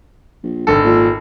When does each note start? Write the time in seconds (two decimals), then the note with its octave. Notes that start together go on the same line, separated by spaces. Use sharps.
0.43 A#1
0.67 G#1 D3 A4
0.84 A#2